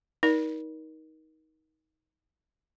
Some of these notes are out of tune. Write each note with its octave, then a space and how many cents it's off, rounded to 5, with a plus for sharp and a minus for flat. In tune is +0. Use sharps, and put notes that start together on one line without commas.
D#4 +20 A#4 +25 D5 +0